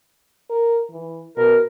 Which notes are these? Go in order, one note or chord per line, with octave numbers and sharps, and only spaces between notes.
A#4
E3
B2 A#4